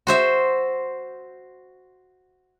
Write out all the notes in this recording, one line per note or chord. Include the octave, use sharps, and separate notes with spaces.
F#4 C5 E5